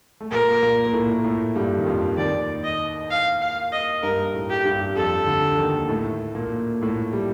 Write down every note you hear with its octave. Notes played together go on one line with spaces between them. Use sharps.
A3
A#2 A#3 A#4
A#2 A#3
A#3
A2 A3
A2 A3
G2 G3
D#3
F2 F3
D#2 D#3 D5
D#5
F5
F5
D#5
G2 G3 A#4
A2 A3
G4
G2 G3
F2 F3 A4
D2 D3
D#2 D#3
A2 A3
A#2 A#3
A2 A3
G3